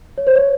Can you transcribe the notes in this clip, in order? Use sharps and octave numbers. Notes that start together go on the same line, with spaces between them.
C#5
C5
C#5